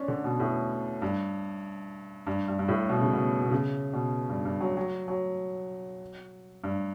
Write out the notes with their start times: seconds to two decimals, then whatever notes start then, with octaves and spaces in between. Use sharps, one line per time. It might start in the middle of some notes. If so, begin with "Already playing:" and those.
Already playing: C#4 D4
0.08 D3
0.24 B2
0.40 A2
1.02 G2
2.27 G2
2.48 G2
2.59 G2
2.68 A2
2.89 B2
3.01 C#3
3.13 B2
3.41 B2
3.51 C#3
3.93 B2
4.29 G2
4.45 G2
4.61 F#3
4.77 F#3
5.08 F#3
6.64 G2